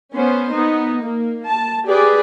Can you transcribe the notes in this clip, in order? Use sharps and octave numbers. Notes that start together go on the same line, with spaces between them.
B3 C#4 C5
B3 D#4
A#3
A5
G4 G#4 B4 D5